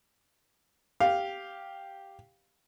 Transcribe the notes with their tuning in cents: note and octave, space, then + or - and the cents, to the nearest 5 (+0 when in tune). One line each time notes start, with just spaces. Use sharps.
G4 +0 F5 +0